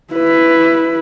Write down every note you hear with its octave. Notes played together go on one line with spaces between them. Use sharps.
E4 B4